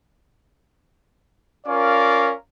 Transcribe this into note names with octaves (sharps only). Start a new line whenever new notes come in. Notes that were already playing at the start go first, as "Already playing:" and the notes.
C#4 F4 A#4 D5 F5